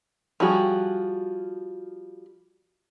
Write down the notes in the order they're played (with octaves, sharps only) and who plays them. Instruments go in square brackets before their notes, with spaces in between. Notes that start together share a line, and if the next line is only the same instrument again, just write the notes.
[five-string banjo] F3 G3 F#4 G#4